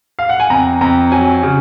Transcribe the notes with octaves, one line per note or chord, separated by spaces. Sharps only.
F5
F#5
G#5
F2 A#5
F2 A#5
F#3 G#5
C#3